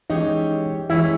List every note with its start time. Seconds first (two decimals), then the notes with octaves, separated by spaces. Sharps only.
0.10 E3 G#3 C#4 D#4 G4 C#5
0.90 E3 G#3 C#4 E4 G4 C#5